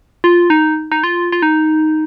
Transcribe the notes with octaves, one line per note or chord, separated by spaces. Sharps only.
F4
D#4
D#4
F4
F4
D#4